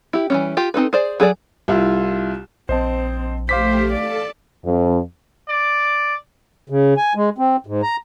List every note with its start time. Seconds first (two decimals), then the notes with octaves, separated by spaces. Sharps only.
0.13 E4 G4
0.30 E3 G3 C#4
0.57 F4 G4
0.74 C4 D#4 A4 B4
0.93 G#4 C5 D5
1.20 F#3 G#4 A4 D5
1.68 C2 E4 F4
2.69 A#1 C4 C5 D#5 A5
3.49 A3 G4 C5 F5 D6 B6
3.93 A4 D5 A5
4.65 F2
5.49 D5
6.70 C#3
6.97 G#5
7.15 G#3
7.38 C4
7.67 G#2
7.82 A#5